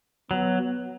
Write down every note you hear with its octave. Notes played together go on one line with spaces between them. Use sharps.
F#3 B3